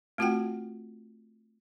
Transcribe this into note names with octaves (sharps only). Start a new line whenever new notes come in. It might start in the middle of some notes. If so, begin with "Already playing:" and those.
A3 C4 F4 F#4 F#5 G5